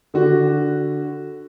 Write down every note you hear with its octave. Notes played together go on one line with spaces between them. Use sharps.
D3 D4 F#4